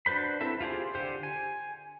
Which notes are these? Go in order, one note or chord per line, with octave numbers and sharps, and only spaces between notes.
D4 F#4 B4 C5 B5
C4 E4 A4 E5
F4 G4 G#4 C5
D3 G4 C5
G#5